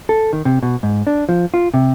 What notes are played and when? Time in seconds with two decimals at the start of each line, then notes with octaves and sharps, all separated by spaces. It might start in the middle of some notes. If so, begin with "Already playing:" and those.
0.09 A4
0.33 D#3
0.45 C3
0.63 B2
0.83 G#2
1.07 D4
1.29 F3
1.54 F4
1.74 C3